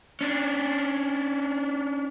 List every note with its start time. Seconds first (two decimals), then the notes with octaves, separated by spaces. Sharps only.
0.21 C#4 D4